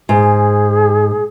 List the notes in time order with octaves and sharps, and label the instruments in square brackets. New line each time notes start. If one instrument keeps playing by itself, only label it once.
[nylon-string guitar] G#2 [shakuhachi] G#4